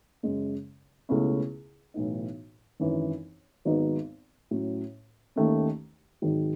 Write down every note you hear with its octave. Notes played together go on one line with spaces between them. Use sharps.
F#2 C#3 G#3 C#4
C#2 B2 A3 C#4 E4
B1 A2 E3 B3 D#4
G#1 F#2 E3
G#1 G#2 F#3 B3 D#4
A2 F#3 C#4
D#2 D#3 A3 C#4
G#1 G#2 D#3 F#3